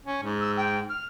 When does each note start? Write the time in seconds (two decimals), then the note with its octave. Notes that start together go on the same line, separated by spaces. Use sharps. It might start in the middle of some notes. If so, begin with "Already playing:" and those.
0.05 C#4
0.23 G#2
0.40 E6
0.57 G5
0.89 F6